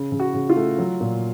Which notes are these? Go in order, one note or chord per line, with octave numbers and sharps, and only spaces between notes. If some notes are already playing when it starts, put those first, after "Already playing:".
Already playing: C#3
C#3
F#4
C#3
F4
A3
F#3
A#2